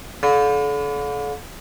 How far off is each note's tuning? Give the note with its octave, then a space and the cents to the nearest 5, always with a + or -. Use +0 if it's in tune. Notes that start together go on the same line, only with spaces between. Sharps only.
D3 -40